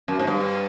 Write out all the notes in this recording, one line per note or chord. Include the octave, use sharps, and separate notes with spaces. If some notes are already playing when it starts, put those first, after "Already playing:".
F#2
G#2
G2